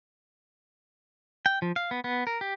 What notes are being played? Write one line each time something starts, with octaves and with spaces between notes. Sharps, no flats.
G5
F3
F5
B3
B3
A#4
G4